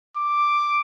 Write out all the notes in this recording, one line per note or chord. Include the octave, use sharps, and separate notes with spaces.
D6